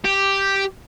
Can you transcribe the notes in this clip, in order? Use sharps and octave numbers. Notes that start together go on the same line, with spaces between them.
G4